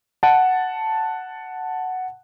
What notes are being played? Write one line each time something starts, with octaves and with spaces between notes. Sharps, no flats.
F#5 A5